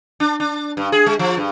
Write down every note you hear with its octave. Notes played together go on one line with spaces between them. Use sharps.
D4
D4
G2
G#4
G#3
F3
G2